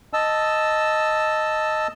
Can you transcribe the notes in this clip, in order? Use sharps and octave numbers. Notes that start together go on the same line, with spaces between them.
D#5 A5 E6